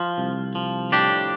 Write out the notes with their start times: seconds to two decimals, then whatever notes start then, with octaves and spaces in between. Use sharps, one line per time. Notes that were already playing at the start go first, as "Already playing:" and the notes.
Already playing: F3 F4
0.18 C2
0.55 F3
0.92 A2 D4 G4